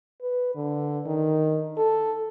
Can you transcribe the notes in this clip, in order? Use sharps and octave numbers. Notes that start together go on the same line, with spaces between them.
B4
D3
D#3
A4